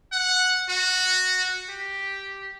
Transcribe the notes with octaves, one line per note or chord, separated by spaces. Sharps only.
F#5
F#4
G4